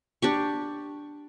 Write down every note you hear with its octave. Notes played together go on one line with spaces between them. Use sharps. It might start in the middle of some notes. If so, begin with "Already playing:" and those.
D4 G4 C#6